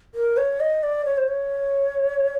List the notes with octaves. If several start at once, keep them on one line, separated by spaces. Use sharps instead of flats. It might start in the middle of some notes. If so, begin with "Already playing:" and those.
A#4
C#5
D#5
D5
C#5
C5
C#5